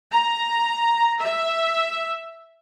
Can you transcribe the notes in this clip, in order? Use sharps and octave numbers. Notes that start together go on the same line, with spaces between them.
A#5
E5